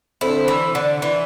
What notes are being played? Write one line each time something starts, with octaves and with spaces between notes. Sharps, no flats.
D3 C4 E4 A4 C5
E3
D3
E3